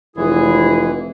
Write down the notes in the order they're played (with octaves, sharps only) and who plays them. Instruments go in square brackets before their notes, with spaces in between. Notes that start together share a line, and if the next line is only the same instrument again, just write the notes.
[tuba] F1 [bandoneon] E3 [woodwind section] G#3 E4 G#4